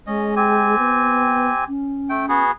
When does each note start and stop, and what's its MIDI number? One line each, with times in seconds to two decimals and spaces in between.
0.07 0.78 56
0.07 0.35 61
0.07 0.35 75
0.36 1.64 60
0.36 1.64 67
0.36 1.64 80
0.79 1.51 59
1.68 2.42 61
2.09 2.26 57
2.09 2.26 79
2.29 2.52 59
2.29 2.52 66
2.29 2.52 68